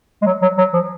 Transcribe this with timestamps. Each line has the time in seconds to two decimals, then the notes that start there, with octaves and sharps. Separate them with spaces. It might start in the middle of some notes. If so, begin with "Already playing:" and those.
0.22 G#3
0.26 F#3
0.42 F#3
0.58 F#3
0.73 F3